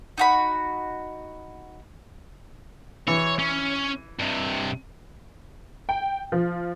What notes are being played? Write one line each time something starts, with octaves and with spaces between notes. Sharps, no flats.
D#4 F#4 B5
E3 C#5
C#4
G2 C3
G5
F3